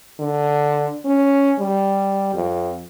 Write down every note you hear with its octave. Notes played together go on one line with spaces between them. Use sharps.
D3
C#4
G3
F2